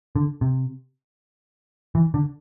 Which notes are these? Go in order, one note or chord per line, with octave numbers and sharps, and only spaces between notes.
D3
C3
E3
D3